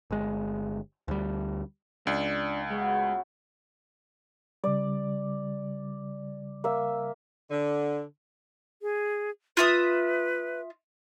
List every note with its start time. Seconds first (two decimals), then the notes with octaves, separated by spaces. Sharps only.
0.11 G1 G#3
1.08 D2 G3
2.07 C#2 D4
2.70 B2 F#3 G#3 A3
4.64 C#3 G3 D5
6.64 A#3 E5
7.50 D3
8.82 G#4
9.57 F4 B4 E5 D#6